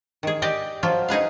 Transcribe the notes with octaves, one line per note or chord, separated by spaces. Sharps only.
D#3 G#4
G4 D5 D#5
F3 F#3 F4
D#4 G#4 B4 F5